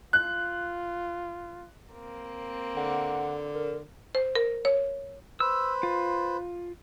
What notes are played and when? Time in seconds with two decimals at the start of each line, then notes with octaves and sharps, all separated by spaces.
0.13 F4 F#6
1.93 A#3 C4
2.76 D3 F#5
3.55 A#4
4.15 C5
4.35 A#4
4.65 C#5
5.40 B4 C5 E6
5.83 F4